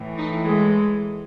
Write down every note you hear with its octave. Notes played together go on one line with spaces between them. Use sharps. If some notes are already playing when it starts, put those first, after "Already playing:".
Already playing: A2 E3
D#4
G#3